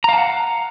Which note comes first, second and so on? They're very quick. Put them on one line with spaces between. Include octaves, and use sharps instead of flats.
A#5 F5 A5 F#5